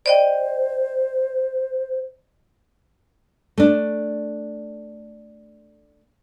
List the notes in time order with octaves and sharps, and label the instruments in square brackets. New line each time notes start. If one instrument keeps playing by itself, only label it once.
[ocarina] C5 [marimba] D5 D#5 G5
[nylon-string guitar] A3 D4